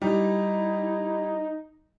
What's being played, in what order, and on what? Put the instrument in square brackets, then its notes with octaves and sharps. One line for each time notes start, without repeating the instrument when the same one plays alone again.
[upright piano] G3 [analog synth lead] D#4 [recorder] E4